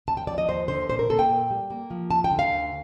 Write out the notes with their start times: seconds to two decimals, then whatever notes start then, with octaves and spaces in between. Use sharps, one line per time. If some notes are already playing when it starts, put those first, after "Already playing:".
0.08 D#2 A5
0.17 G5
0.27 F3 D5
0.38 D#5
0.48 D#2 C5
0.68 D3 C5
0.89 A#2 C5
0.99 A#4
1.09 A#3 A4
1.19 G5
1.30 A#2
1.51 G3
1.70 A#3
1.91 F3
2.11 D#2 A5
2.24 G5
2.31 D3
2.39 F5
2.51 D2